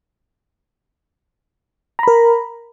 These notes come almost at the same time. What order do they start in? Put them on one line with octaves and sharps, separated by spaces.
A#5 B5 A#4